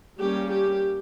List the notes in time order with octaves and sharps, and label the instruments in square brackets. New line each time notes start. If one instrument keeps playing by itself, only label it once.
[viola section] G3 A#3 C#4 G4
G4